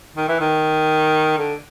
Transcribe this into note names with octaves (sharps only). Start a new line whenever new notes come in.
D#3
E3
D#3
D3